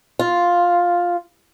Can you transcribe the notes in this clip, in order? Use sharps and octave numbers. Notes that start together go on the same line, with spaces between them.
F4